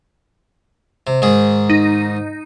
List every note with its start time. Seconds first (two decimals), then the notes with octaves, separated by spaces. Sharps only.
1.07 C3
1.22 G#2 D#3 G#4
1.70 D#4